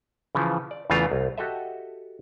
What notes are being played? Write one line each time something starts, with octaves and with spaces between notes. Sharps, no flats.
C#3 E3 F3
D5
E2 C#3 E3 A3 F4 A#5
C2
F#4 G4 A4 D#5 E5